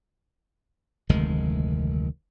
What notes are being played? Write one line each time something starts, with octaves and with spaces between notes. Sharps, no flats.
F1 D2 D#3 G#3